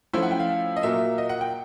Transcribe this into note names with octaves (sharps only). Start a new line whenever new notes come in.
F3 A3 C#4 E4 C5
F#5
G5
F5
D#5
A#2 F#3 A#3 E5
D#5
F#5
G5